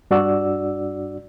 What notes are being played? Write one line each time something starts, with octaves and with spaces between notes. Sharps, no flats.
G2 D4 F#4 D5 E6